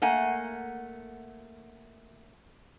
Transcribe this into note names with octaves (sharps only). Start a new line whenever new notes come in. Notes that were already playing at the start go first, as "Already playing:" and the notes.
A3 A#3 F#5 G#5